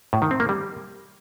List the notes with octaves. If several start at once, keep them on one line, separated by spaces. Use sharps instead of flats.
A2
D#3
C4
A#3
G3